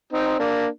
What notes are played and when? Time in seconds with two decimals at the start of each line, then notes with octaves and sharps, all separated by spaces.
0.13 C4 D#4
0.39 A#3 D4